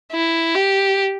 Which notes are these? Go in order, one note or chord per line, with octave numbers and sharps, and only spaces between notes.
E4
G4